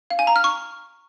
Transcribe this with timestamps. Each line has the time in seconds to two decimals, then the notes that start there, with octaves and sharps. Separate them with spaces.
0.10 F5
0.19 G#5
0.27 A#5
0.36 F6
0.44 C#6